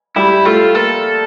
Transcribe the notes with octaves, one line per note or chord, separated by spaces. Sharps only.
G3 E4 G4
A3 F4 A4
A#3 A4 A#4